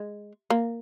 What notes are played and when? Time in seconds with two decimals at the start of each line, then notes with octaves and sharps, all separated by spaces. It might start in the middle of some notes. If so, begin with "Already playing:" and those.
Already playing: G#3
0.50 A#3